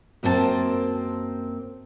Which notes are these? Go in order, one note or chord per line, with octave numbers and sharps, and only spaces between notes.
F#2 A#3 C4 A4 A5